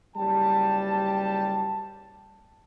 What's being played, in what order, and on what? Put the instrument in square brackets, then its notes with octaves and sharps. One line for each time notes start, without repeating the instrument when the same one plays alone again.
[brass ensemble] F#1 G3 G4 G5 A5